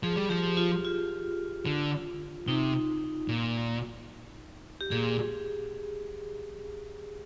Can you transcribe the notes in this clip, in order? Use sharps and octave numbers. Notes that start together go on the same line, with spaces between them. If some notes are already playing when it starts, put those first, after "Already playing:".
F3 G#4
G3
F3 G4
F4
F4
D3
C3 D#4
A#2
G4
A#2 G#4